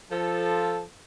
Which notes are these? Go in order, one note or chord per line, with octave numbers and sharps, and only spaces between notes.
F3 A4